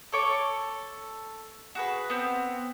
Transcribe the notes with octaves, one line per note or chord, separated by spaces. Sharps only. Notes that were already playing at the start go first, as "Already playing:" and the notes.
A4 C#5 D6
F#4 G#4 B4
B3 C4